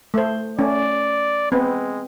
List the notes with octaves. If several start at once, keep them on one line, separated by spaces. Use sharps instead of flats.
A3 C5
A3 C#4 D5
G#3 B3 C4